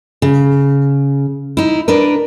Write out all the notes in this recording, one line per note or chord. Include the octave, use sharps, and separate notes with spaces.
C#3
D#4 E4
D4 A#4 B4